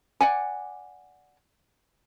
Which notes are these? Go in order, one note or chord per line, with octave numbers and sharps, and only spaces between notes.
D5 F#5 G#5